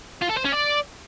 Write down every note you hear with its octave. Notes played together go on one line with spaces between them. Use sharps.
F4
A4
C5
C#4
D5